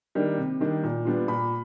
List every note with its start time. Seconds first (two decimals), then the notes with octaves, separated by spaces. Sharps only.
0.15 D#3 G3 A#3 D4
0.38 C3
0.60 D#3 G3 A#3 D4
0.84 A#2
1.05 G3 B3 D4 F4
1.28 A#2 B5